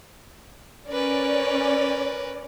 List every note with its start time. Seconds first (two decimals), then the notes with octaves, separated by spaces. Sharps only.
0.89 C#4 A#4 B4 D5